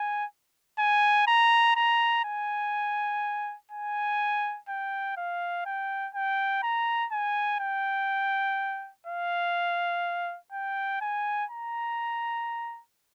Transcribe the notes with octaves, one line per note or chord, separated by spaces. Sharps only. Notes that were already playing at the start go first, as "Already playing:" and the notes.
Already playing: G#5
G#5
A#5
A#5
G#5
G#5
G5
F5
G5
G5
A#5
G#5
G5
F5
G5
G#5
A#5